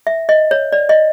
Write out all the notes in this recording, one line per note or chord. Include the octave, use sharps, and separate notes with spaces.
E5
D#5
C#5
D5
D#5